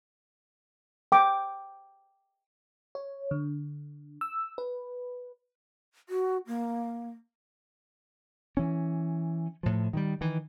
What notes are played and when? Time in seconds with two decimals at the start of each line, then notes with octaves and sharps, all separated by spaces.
1.12 G5 D6
2.95 C#5
3.31 D3
4.21 E6
4.58 B4
6.09 F#4
6.47 A#3
8.57 E3 C#4
9.63 A2 F3
9.93 D#3 E3 G3
10.21 D#3 E3